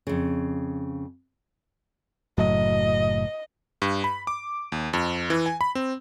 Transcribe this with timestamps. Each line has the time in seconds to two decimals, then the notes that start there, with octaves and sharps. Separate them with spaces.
0.07 F2 C#3
2.38 F#1 A2 F#3 D#5
3.82 G2
4.04 B5
4.27 D6
4.72 D#2
4.93 F2
5.30 E3
5.46 G#5
5.61 B5
5.75 C4